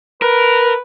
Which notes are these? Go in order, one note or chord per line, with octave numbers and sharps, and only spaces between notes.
A#4 B4